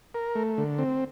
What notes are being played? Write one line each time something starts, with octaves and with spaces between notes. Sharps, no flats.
A#4
A3
D3
C4